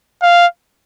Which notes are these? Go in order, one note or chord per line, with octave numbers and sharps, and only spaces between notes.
F5